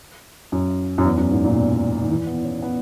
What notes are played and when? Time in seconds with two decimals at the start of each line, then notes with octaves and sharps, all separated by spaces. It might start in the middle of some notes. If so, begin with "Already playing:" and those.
0.52 F#2
0.98 F#2
1.05 E2
1.18 F#2
1.31 G#2
1.45 A#2
1.57 B2
2.03 D#3
2.10 E3
2.27 B3
2.45 C#4
2.62 B3